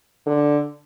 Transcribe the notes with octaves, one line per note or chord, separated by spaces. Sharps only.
D3